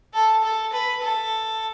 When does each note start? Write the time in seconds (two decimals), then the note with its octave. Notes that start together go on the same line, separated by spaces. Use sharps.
0.14 A4
0.43 A4
0.73 B4
1.02 A4